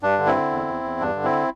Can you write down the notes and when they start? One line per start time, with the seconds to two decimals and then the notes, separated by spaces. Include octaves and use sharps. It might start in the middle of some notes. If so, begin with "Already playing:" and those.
0.03 G2 D4
0.19 D3
0.26 C4 E4
0.35 D3
0.51 E2
0.68 E2
0.84 E2
1.00 G2 D4
1.16 D3
1.24 C4 E4